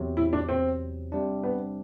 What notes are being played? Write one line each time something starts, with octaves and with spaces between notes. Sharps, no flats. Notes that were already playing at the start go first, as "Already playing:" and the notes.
Already playing: E2 C3 F#3
E4
D4
C4
C3 G3 D4
B3